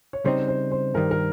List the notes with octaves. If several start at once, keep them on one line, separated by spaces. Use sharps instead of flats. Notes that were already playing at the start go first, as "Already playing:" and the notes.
C#5
C#3 G3 C4 D#4 C5
C5
C5
G2 D#3 G3 A#4
A#4